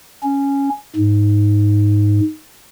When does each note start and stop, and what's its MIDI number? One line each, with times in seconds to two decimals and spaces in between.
0.23 0.69 61
0.96 2.20 44